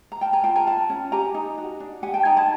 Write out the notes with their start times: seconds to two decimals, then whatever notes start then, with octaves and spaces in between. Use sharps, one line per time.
0.12 A#5
0.21 A#4 G5 A5
0.33 G#5 A#5
0.44 F4 G5 A5
0.56 G#5 A#5
0.67 F4 A5 B5
0.90 C#4
1.12 G4 G#5 A#5
1.35 D#4
1.58 F#4
1.80 D4
2.02 G4 F#5 G#5
2.14 G5 A5
2.25 D#4 G#5 A#5
2.37 A5 B5